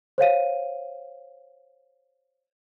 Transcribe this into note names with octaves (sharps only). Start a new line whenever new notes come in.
C5 C#5 F5 D#7